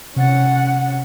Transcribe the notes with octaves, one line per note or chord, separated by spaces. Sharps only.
C3 C#4 F#5 A6